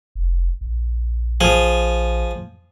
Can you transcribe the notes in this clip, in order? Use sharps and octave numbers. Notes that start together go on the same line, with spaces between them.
F1
A#1
F3 G#4